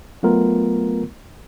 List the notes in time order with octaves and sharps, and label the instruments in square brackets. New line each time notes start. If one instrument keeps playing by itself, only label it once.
[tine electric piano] F#3 A3 B3 F4 A#4